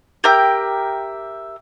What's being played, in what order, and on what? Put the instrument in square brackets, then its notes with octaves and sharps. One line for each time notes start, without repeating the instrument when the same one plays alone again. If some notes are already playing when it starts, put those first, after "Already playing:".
[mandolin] G4 A#4 E5 G5